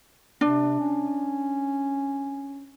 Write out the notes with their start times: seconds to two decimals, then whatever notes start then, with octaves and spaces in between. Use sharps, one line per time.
0.41 C3 D4
0.80 C#4